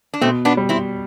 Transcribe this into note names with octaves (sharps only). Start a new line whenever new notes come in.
D4
B2 A3 C4
B3 D4
G3
C4 E4